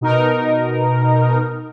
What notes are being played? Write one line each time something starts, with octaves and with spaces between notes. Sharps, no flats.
B2 D#4 A#4